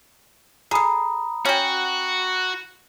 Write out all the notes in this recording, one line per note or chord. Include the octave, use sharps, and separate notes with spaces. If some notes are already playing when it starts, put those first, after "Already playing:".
G#4 A4 A#5 B5 D#6
C#4 F#4 G5